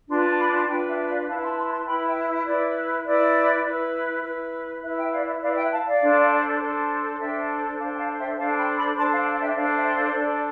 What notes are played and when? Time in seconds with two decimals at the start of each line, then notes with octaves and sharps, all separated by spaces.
0.09 D4 F4 B4 A5 C6
0.24 A5 C6
0.39 B5 D6
0.53 A5 C6
0.68 D4 F4 B4 G5 B5
0.88 E5 G5
1.08 D5 F5
1.27 E4 F5 A5
1.32 B4
1.42 A5 C6
1.57 A5 C6
1.71 A5 C6
1.86 E4 B4 G5 B5
2.06 E5 G5
2.26 E5
2.45 E4 B4 D5
3.05 E4 B4 D5
3.65 E4 B4
4.23 E4 B4
4.82 E4 B4 E5
4.97 E5 G5
5.12 D5 F5
5.27 E5
5.42 E4 B4 D5 F5
5.56 E5 G5
5.71 F5 A5
5.86 D5 F5
6.01 D4 A4 C5
6.60 D4 A4 C5
7.19 D4 A4 C5 E5 G5
7.78 D4 A4 C5 F5 A5
7.93 G5
7.98 F5 A5
8.18 E5 G5
8.37 D4 A4 C5 F5 A5
8.53 A5
8.57 G5 B5
8.77 B5 D6
8.96 D4 A4 C5 A5 C6
9.11 F5 A5
9.26 F5 A5
9.42 E5 G5
9.56 D4 A4 C5 D5 F5
9.76 E5 G5
9.86 G5
9.95 D5 F5
10.15 D4 A4 C5 D5